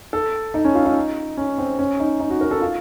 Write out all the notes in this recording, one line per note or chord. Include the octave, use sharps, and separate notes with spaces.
A4
D#4
C#4
F4
D#4
C#4
C4
C#4
D#4
D#4
F#4
A#4
A4
F4